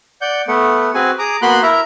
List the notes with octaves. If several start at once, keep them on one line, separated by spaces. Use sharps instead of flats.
D5 F#5 G6
A3 B3 F#5
C4 F#4 G#4 B4 G#5
G#4 A#5 D6 D#6
A#3 B3 F#4 B5 C6 F#6
E4 A#4 E5 A#5